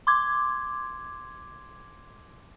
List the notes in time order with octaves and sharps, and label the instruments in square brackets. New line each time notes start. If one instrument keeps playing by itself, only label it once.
[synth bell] C6 D6 G#6